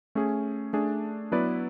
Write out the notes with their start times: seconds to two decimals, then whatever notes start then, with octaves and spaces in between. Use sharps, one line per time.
0.15 A3 C#4 G#4
0.73 A3 D4 G#4
1.32 F#3 B3 E4 B4 D5